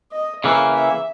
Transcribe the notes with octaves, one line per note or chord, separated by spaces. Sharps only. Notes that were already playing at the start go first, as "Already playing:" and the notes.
D#5
C#3 E3 A#3 E5
E5